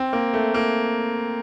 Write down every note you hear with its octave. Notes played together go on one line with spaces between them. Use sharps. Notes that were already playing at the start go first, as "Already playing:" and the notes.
Already playing: C4
A#3
A3
A#3